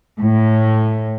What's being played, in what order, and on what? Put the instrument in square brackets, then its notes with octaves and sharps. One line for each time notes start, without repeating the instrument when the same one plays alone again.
[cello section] A2